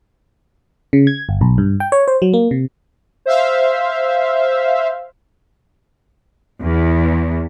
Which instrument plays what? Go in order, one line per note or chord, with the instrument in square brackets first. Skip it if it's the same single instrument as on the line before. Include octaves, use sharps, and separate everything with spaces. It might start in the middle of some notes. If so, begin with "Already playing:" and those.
[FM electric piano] C#3
G#6
G1
B1
G2
G5
C#5
C5
F#3
A#3
C3
[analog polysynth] C5 E5 F5
[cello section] E2